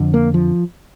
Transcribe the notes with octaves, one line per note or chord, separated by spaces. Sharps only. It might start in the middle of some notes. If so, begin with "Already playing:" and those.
Already playing: F2 D3
A#3
F3